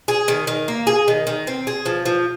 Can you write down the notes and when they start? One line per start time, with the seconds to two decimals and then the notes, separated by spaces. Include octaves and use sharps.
0.08 G#4
0.28 D#3
0.47 D#3
0.68 A#3
0.87 G#4
1.08 D#3
1.27 D#3
1.47 C4
1.67 G#4
1.86 F3
2.06 F3